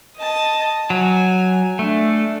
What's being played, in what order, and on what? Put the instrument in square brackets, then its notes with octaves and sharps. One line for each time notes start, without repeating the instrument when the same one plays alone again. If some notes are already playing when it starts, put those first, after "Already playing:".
[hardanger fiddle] D#5 A5
[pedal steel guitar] F#3 [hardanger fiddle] G#5
[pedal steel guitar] A3 [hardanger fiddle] D4